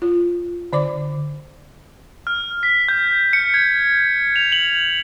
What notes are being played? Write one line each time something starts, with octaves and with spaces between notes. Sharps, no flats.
F4
D3 D5 D6
F6
B6
G6
C#7
G#6
F7
F#7